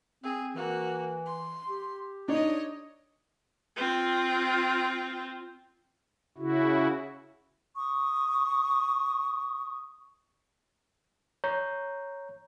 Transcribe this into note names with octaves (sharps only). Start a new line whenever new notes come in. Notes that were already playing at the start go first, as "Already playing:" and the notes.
C4 G#4
E3 A#3 F#4
C6
G4
D4 D#4 C#5 D#5
C4 F4
C#3 E4 F#4
C#6 D#6
C#5 A#5 G6